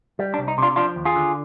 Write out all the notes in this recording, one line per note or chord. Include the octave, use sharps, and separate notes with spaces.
G3
D4
C2
D#4
C3 D4 F4
F3 D4 F4
D#2
F4 G#4
D3